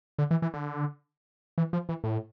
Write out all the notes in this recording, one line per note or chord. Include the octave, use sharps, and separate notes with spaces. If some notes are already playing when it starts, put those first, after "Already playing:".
D3
E3
E3
D3
E3
F3
E3
A2